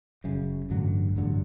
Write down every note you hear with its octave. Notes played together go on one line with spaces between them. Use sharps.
F#1 F#2 C#3
A1 G2 D3 F#3
A1 G2 D3 F#3